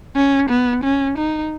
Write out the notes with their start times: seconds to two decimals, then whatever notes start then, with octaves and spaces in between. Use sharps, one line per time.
0.16 C#4
0.49 B3
0.84 C#4
1.18 D#4